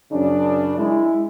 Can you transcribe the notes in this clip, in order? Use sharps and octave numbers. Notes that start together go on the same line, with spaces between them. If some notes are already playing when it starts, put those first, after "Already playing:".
F#2 C#3 D4
G#3 E4